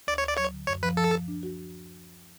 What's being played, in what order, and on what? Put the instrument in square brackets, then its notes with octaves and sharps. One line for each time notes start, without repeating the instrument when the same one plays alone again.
[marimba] D2 [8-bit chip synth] D5
[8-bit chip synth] C#5
[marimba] D2
[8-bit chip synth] D5
[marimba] F#3 [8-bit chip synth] C#5
[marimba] D3
[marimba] F#2 [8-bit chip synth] C#5
[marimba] F3 [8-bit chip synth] B4
[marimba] F3 [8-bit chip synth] A4
[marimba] F3
D4
F#4